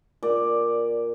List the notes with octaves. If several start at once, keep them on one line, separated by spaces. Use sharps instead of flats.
A#2 D5